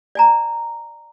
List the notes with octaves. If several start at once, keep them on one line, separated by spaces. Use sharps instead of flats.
D5 G#5 A#5